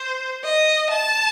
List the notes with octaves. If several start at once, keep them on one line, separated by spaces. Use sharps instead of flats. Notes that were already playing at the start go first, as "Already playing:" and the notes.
Already playing: C5
D#5
A5